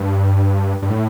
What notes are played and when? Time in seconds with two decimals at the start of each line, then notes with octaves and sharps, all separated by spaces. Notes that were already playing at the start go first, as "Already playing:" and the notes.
Already playing: G2
0.82 G2
0.90 A2